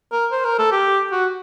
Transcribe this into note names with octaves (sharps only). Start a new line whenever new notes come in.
A#4
C5
A#4
A4
G4
F#4